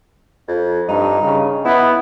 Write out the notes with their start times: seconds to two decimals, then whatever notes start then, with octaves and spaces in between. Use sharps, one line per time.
0.48 F2
0.88 G2 D#4
1.21 C#3
1.65 B3 E4